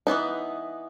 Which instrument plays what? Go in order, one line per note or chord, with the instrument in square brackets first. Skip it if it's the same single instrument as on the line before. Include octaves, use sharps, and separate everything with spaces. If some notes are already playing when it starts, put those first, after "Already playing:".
[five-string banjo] E3 F#3 B3 D#4